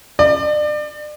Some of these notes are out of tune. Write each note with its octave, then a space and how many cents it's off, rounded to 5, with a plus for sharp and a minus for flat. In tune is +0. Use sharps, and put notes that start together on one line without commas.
D5 +35